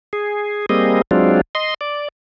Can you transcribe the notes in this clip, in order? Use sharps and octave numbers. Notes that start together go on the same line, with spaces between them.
G#4
G3 A#3 C4 G#4 D#5
F#3 G#3 C4 D4 F4
D#5 C6
D5